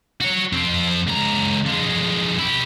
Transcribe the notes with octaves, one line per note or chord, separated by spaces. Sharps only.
F#4 C#5
F2 C4
C#2 A#5
F2 G#3
E4 G4